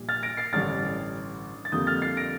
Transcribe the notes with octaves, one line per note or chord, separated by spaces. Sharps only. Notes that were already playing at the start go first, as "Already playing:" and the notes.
Already playing: A#1 A#2 G3
F6 A6
A#6 D7
A6 C7
A1 G2 D3 G3 F6 A6
A6
F2 D3 G3 A#3 D#6 G6
F6 A6
A6 C7
A#6 D7